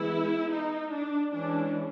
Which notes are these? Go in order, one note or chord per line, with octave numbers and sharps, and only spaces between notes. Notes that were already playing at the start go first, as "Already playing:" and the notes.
Already playing: E3 G#3 B3 E4
D#4
D4
E3 G#3 C#4 D4